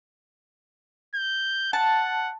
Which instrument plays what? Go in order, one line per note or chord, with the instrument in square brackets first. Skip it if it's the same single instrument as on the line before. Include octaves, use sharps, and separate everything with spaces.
[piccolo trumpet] G6
[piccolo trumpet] F#5 [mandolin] A5